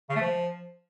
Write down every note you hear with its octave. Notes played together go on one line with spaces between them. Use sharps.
C#3
A3
F3